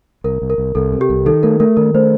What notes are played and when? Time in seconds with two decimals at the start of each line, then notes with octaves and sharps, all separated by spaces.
0.24 C2 A#4
0.42 C2
0.50 A#4
0.58 C2
0.75 C2 A4
0.92 C3
1.01 G4
1.10 C2
1.26 D#3 A4
1.43 A3 A#4
1.60 A3 A#4
1.77 D#3 A#4
1.94 A3 C5